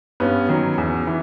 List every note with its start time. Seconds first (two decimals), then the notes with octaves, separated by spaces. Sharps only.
0.20 G2 B3 C#4
0.49 D#3 F#3
0.78 E2
1.07 E3